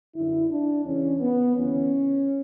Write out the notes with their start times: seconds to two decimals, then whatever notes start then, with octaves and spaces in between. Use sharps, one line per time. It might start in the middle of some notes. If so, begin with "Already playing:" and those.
0.15 F#2 D3 E4
0.51 D4
0.85 E2 C#3 E3 C#4
1.21 B3
1.56 D2 C#3 E3 C#4